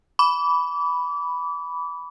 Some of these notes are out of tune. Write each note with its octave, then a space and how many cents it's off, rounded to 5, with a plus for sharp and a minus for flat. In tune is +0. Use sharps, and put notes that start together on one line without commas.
B5 +0 D6 -30